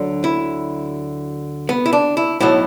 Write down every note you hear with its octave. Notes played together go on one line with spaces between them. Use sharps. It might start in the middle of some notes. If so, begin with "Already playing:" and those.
Already playing: D2 D3 F#3
E4
B3
E4
D4
E4
B1 A2 F#3 A3 E4